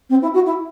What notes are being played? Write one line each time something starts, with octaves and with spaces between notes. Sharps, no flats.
C4
E4
F#4
E4